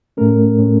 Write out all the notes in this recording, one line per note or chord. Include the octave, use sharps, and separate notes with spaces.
A2 A3 C#4 A#4
A2 A3 C#4